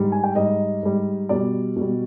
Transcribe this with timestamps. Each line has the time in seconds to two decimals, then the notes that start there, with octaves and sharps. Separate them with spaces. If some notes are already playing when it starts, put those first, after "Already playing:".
Already playing: G#2 G3
0.12 G#5
0.24 G5
0.35 G#2 G3 D#5
0.83 G#2 G3
1.29 B2 G3 D5
1.76 B2 G3